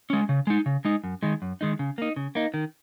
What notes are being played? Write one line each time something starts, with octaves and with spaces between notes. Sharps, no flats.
G#3 C#4
C#3
G#3 D#4
C#3
G#3 D#4
F#2
D#3 G#3 D#4
F#2
D#3 G#3 D#4
C#3
A#3 D#4
C#3
A#3 D#4
D#3